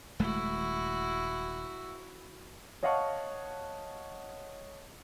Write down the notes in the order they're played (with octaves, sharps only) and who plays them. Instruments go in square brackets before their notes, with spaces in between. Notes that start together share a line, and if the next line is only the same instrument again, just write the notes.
[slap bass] D#1 G#3 A3 [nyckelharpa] E4 F#4
[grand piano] C#5 D#5 F5 F#5 A5 C#6